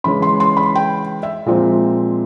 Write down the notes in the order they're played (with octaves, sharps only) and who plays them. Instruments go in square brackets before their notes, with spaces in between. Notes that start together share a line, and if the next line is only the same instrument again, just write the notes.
[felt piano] C#3 E3 G#3 C#4 B5
C6
C6
B5
G5
E5
A#2 F3 G#3 C4